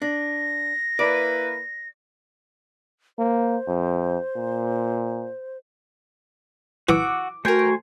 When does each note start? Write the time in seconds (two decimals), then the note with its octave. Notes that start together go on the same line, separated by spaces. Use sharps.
0.02 D4 A#6
0.99 A#3 E4 B4 D5
3.19 A#3 C5
3.68 F2
4.36 A#2
6.89 E3 F#4 F#5 D6 E6
7.45 A3 F#4 A#4 C5 G5 G#5